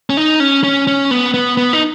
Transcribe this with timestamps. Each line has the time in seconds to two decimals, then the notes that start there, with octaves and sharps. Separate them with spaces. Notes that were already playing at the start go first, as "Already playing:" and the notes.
0.10 C#4
0.17 D#4
0.40 C#4
0.63 C#4
0.87 C#4
1.11 B3
1.34 B3
1.57 B3
1.73 D#4